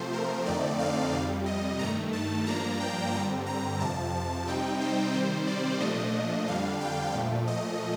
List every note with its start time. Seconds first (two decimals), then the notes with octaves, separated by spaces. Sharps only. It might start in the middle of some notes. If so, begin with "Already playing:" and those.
Already playing: C3 F3 A3 C5
0.13 A#4
0.46 F2 D3 A3 C4 D#4 D5
0.79 F5
1.12 F2 C3 G3 F5
1.46 D#5
1.79 G2 D#3 A3 A#5
2.13 A5
2.46 G2 F3 A#3 D4 A#5
2.80 G5
3.13 G2 D3 G3 C4 A#5
3.46 A#5
3.80 F2 C3 F3 A5
4.47 C3 G3 C4 D#4 G5
4.81 C5
5.14 C3 D#3 G3 C5
5.47 D5
5.80 A#2 F3 A3 D4 D#5
6.48 F2 D3 G3 D4 F5
6.81 G5
7.14 A#2 F3 A3
7.47 D#5